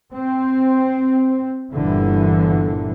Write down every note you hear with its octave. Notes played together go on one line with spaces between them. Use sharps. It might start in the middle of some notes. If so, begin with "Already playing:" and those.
C4
G1 G2 A#2 D3 E3